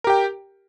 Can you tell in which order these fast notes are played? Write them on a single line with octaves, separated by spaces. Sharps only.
A#4 G4 G5